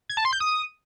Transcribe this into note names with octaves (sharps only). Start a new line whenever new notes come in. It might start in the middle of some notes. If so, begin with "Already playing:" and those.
G#6
A5
C6
G6
D#6